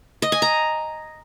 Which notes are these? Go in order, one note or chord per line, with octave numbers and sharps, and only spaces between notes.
D#5
G#5
A#5